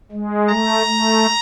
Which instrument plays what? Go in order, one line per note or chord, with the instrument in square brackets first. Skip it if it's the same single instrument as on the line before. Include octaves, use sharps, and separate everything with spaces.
[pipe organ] G#3
[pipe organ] A3 [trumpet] A#5
[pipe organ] A3